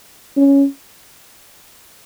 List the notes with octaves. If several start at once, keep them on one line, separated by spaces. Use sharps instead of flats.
C#4